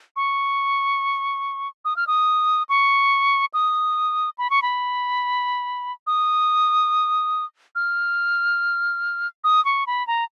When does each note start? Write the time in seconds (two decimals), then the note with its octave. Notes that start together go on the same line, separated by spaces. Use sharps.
0.16 C#6
1.85 D#6
1.96 F6
2.07 D#6
2.69 C#6
3.54 D#6
4.38 B5
4.50 C#6
4.62 B5
6.07 D#6
7.75 F6
9.44 D#6
9.65 C#6
9.87 B5
10.07 A#5